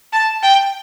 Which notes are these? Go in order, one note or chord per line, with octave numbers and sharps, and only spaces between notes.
A5
G5